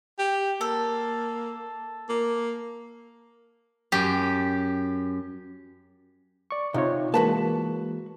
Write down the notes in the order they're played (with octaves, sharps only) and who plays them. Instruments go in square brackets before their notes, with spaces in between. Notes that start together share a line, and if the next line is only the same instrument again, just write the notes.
[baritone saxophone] G4
[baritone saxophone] A#3 [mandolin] A4
[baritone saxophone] A#3
[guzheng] F#2 G4
[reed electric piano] D5 C#6
[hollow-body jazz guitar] C3 [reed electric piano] D#4 F4 C#5
[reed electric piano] E3 G#3 A#3 [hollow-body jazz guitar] F#4 B4 A5